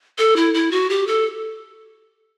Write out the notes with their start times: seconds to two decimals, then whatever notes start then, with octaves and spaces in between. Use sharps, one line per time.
0.18 A4
0.36 E4
0.54 E4
0.71 F#4
0.90 G4
1.07 A4